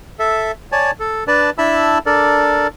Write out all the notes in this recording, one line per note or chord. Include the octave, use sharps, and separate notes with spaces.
A4 E5
C#5 D5 G#5 A5
A4
D4 B4 D5 A5
D4 E4 E5 A5 B5 E6
D4 A4 A#4 D5